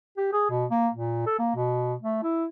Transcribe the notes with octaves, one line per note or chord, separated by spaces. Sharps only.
G4
G#4
B2
A#3
A#2
A4
A#3
B2
A3
E4